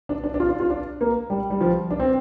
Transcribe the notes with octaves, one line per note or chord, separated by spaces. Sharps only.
D4
D4
D4
F4
D4
F4
D4
A#3
G3
G3
F3
D4
C4